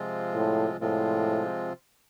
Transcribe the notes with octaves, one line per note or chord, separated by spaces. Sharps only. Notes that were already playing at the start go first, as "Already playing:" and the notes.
Already playing: C3 F3 G#3 C4 F4
A2
A2 C3 F3 G#3 C4 F4